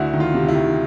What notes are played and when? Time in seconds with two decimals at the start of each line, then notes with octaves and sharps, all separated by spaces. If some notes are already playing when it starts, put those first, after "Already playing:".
Already playing: D2 E4 F#4
0.13 D#3
0.20 F4
0.34 C3
0.49 E4
0.55 D#3